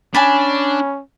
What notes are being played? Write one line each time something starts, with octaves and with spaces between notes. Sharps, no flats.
C#4 D4 G#5 A5 B5